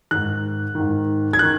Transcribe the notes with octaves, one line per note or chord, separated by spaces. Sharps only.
G#2 D#3 F#6
G#2 D#3
G#6
D#3 F#6